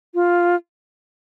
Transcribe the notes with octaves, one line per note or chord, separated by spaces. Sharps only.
F4